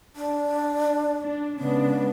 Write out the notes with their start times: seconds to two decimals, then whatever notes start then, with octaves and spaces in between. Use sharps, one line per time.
0.16 D4
1.23 D4
1.59 C#3 G#3 B3 D4